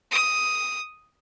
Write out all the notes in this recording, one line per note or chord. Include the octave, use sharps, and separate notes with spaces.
D#6